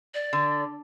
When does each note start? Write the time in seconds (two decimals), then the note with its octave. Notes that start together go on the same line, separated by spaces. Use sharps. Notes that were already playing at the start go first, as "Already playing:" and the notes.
0.14 D5
0.33 D3